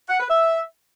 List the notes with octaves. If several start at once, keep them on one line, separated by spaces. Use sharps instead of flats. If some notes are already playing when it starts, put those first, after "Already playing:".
F#5
B4
E5